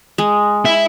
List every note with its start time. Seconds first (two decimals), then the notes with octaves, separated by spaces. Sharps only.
0.18 G#3
0.65 E4 E5